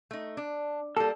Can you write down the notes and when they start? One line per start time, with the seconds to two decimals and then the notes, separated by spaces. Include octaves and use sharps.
0.11 A3 D#4
0.37 D4
0.97 G3 A#3 A4